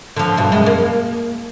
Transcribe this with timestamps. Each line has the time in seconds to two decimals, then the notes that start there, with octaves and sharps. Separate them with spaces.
0.16 D3 F3
0.37 G2 B2
0.52 F#2 G#3
0.66 A#3